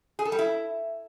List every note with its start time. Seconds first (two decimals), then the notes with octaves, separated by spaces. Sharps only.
0.19 G#4
0.25 A4
0.32 G3
0.39 E4